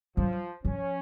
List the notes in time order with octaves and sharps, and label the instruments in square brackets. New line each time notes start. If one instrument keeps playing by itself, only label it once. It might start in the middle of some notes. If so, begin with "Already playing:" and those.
[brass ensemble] F3 [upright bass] F#3
[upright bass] F3 [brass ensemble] C#4